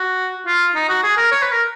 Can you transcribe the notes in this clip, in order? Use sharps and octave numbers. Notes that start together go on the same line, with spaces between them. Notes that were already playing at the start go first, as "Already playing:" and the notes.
Already playing: F#4
F4
D#4
F#4
G#4
A#4
C#5
B4
A#4